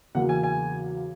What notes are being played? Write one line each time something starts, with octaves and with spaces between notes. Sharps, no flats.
E2 C#3 F#3 A#3 F#5
G#5
G#5